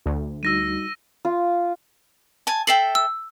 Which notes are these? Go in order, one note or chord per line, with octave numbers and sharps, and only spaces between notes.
D2
G3 D#4 F#4 E6 A#6 D#7
F4
G#5 A5
A4 E5 G5 C7 F#7
E6